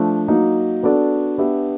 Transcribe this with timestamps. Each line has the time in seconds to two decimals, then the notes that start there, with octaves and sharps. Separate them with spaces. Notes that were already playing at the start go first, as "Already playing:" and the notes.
Already playing: F3 A3 D4
0.28 F#3 A#3 D#4
0.83 B3 D4 F#4 A4 D5
1.38 B3 D4 G4 B4 E5